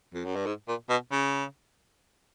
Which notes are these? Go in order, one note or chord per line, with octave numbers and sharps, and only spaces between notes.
F2
F#2
G2
G#2
A#2
B2
C#3